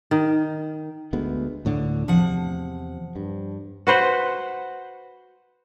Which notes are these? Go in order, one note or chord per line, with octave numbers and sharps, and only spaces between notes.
D#3
D2 G#3 B3
D2 A2 D3
E2 C3 F3 F#5
G2
F#4 B4 C5 F#5